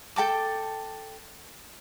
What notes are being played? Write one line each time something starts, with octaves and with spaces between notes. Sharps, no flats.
A4 G5 A5 D6